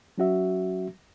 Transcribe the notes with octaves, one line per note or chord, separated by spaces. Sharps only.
F#3 C#4 F#4 E5